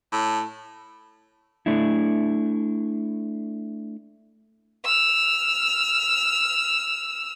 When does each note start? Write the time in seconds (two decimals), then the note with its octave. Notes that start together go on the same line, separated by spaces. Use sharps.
0.12 A2
1.66 A3 D4 E4
4.84 E6 F6